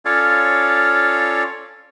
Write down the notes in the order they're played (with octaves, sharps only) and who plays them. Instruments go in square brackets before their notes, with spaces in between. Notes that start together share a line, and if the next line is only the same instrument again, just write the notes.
[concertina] C#4 F4 A4 C#5 D5 F5